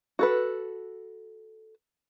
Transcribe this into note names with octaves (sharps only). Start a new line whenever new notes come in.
F#4 A4 B4